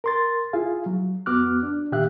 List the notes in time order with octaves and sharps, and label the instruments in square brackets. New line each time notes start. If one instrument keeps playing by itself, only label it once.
[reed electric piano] A#4 C6 A6
E4 F4 G#4 F5
F#3
F2 B3 F#4 D6 F6 F#6
D4
A#2 D#3 G4 E5 F5 F#6